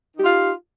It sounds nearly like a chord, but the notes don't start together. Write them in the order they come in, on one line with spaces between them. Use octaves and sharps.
D#4 G4 F4 F5